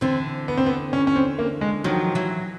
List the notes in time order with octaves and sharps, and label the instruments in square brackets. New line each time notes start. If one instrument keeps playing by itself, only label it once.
[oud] D3 E3 [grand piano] C4
[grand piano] B3
C4
B3
C#4
C#4
C4
A#3
G#3
[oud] D#3 F3 [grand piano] F#3
[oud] E3 F#3